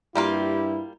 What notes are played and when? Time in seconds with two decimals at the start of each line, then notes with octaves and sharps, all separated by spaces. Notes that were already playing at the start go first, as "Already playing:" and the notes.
0.15 G2 G3 A#3 E4 F4 G4